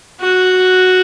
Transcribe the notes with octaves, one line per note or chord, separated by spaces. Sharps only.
F#4